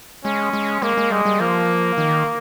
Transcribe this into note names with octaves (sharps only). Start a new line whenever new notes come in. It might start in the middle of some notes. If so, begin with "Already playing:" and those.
G#3 C#4
G#3
G#3 A#3
G#3
G3 G#3
G3
F3 A#3
D#3